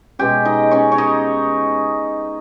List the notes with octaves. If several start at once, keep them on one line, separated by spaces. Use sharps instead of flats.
B2 G#3 C#4 G4 G5
D#4 D#5
C#4 C#5
C#5
D#4 D#5